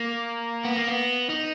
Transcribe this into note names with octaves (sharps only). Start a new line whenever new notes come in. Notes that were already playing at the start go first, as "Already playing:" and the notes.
Already playing: A#3
B3
A#3
B3
D#4